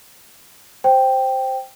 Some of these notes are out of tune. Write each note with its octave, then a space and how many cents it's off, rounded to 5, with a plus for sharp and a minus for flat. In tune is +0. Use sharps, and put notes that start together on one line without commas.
C5 +0 G5 +0